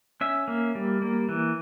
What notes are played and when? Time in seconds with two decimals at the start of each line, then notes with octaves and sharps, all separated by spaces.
0.21 C#4 E5
0.48 A#3
0.75 G3
1.02 A#3
1.29 E3